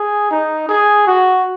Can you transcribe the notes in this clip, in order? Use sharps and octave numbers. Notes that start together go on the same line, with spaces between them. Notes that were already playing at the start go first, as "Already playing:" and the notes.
Already playing: G#4
D#4
G#4
F#4